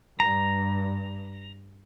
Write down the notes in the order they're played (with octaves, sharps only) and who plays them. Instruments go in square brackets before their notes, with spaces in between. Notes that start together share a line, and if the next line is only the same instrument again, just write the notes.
[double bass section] G2 [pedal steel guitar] A#5